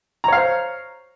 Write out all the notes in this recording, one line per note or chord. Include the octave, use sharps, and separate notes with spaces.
C5 C#5 F5 A#5